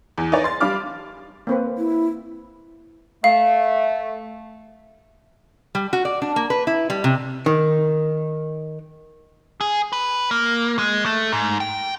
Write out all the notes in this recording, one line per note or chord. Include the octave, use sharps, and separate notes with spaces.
E2
D#4 B4 C#5 D5
C6 A6
G3 D4 F5 B5 D6 F6
A#3 C4 B4
E4
A3 F5
G3
F#4
D5
D4
A#3
B4
E4
G3
C3
D#3
G#4
B4
A#3
G#3
A3
G#2
G5